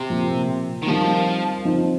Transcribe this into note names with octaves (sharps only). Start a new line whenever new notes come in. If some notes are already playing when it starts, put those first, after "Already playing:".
Already playing: C3
A#2 F3 A#3
D#3
F3 G3 C4 D#4 A#4
F3 C4 D#4